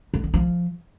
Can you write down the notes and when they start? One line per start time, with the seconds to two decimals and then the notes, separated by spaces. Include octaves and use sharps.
0.14 D3
0.24 G#3
0.34 F3